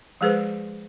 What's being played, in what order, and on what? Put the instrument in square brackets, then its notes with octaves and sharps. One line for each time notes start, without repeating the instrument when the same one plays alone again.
[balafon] F3 G#3 G#4 B4 C5